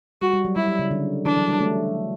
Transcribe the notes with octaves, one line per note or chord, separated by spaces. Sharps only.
G3 F#4
G3
F#3
G3 E4
F#3
C#3
D3
E3 D4
F#3
G3
A3